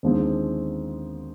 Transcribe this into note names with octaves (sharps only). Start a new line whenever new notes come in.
D#2 D3 F3 G#3 C4